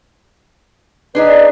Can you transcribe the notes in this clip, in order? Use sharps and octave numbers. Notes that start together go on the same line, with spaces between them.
D4 D#4 G#4 B4 D5 D#5